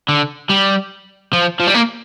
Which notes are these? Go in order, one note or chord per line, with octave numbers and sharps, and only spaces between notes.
D3
G3
F3
F3
G3
A#3